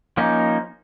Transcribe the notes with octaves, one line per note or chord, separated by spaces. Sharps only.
F3 A#3 C#4 D#4